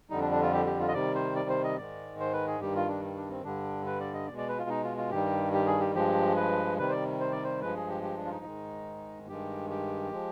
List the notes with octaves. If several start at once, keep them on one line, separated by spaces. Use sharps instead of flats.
F2 D3 G3 D#4
D4
D4
F4
G4
G4
F4
D#5
C3 D#3 G3 D5
C5
D5
C5
D#5
G#2 D#3 G#3 D5
C5
B4
G#4
G2 D#3 G3 G4
F4
D4
D4
C4
G2 D3 G3 D4
B4
D5
D#5
B2 G#3 D5
D5
B4
F4
D#4
F4
F4
G2 D#3 G3 G4
G4
G#4
G4
G2 F3 G#3 G4
B4
C3 D#3 G3 B4
C5
D5
C5
D5
C5
G2 F3 G#3 B4
G#4
G4
G4
D4
F4
D#4
G#2 D#3 G#3
G2 D#3 G#3 G4
G4
F3 G#3